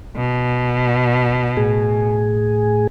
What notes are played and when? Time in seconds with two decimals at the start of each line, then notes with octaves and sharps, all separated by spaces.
0.16 B2
1.57 A2 G#4